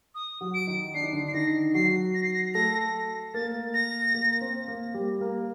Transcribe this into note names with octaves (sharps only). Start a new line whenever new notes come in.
D#6
F#3 F#4
D7
D#3 D#4
D4 C7
D#4
D3 D4
C7
D#3 D#4 A#6
F#3 F#4 C7
A#6
C7
A#6
A3 A4 A#6
A#3 A#4 A6
A#6
A#3 A#4
C4 C5
A#3 A#4
G3 G4
A#3 A#4